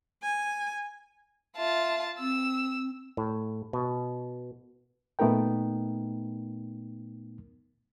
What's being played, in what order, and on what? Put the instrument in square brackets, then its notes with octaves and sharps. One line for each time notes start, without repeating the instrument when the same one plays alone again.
[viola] G#5
[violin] F4 A5 [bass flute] E5
[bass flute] C4 [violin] E6
[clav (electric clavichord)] A2
B2
[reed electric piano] A#2 A3 B3 D#4 A#4 G5